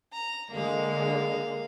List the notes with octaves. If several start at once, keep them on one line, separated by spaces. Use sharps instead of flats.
A#5
D3 G#3 A#3 F5